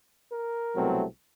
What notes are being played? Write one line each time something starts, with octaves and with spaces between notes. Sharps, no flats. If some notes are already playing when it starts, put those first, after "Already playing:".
A#4
C2 B2 F#3 A3 C4